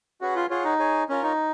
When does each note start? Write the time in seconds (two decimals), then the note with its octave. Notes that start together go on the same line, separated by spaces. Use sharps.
0.21 C#4 F#4 G#4 B4 F#5
0.35 F4
0.50 F4 G#4 C#5 F#5
0.64 D#4
0.79 G#4 C#5 G#5
1.09 C#4 F4 A#4 C#5
1.23 D#4